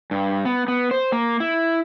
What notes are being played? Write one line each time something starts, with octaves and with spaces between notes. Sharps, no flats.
G2
B3
B3
C5
A#3
E4